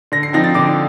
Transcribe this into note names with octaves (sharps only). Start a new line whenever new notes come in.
D3 A#6
C7
F3 C4 D#4 A#6
A6
D3 D6